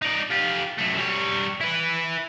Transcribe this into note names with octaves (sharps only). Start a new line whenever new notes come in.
D#4 D5
F4 G4
F#2 A3
G3 C#5
E4 B4